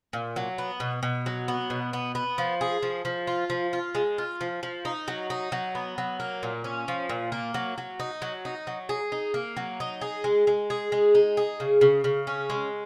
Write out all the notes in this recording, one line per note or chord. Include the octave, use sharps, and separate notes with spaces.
A#2
F#3
B3
B2
B2
F#3
B3
B2
B3
B3
F3
G#4
F3
F3
F4
F3
F4
G#3
F4
F3
F3
D#4
F#3
D#4
F#3
B3
F#3
A#3
A#2
C#4
F3
A#2
A#3
F#3
F#3
D#4
F#3
D#4
F#3
G#4
D#4
A#3
F#3
D#4
G#4
G#3
G#3
G#4
G#3
D#4
G#4
C#3
C#3
C#3
C#4
G#3